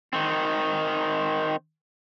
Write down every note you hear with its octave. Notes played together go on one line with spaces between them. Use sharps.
D#3 C4